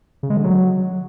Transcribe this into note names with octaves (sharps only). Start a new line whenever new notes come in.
C#3
G#3
D3
F#3